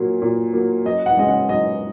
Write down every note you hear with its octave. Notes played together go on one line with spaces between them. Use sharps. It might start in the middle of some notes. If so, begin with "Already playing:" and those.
Already playing: A#2 F#3 A#3
A#2
F#3 A#3
F#2 D#5
F#5
C#3 G#3 D#5
F#5
F#2 D#5